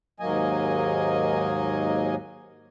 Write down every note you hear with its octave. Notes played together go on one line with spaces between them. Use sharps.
D#2 G#2 F#3 A#3 D#5 G#5